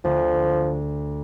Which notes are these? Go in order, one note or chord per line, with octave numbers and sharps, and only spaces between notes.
D2 F3